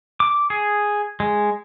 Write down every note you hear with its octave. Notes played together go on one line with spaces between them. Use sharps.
D6
G#4
G#3